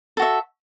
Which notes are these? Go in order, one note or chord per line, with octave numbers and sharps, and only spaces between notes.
F#4 A4 E5